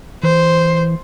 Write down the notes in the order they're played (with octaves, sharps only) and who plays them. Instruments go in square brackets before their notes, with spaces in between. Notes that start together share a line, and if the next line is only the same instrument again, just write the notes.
[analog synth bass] E3 [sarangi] C5